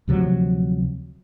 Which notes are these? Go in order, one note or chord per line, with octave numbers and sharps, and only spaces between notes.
D2 C3 F3 F#3